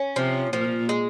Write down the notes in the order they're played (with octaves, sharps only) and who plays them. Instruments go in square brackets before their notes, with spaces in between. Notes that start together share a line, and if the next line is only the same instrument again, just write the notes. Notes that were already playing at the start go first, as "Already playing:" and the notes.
Already playing: [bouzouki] C#4
[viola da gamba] C3 [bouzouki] F3
[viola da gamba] A#2 [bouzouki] F3
[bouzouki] G#3